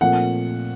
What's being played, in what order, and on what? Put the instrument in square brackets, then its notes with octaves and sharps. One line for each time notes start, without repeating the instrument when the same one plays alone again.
[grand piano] A#2 F3 A3 C4 F#5